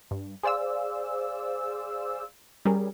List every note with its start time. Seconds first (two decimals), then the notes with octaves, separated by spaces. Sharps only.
0.11 G2
0.43 G#4 C5 D5 F5 E6
2.65 G3 C#4 G#4 A#4